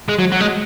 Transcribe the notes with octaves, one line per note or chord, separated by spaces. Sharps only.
G#3
F#3
F#3
G#3